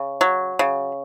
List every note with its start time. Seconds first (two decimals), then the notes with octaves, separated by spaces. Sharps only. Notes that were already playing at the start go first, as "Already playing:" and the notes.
Already playing: C#3
0.21 F#3
0.59 C#3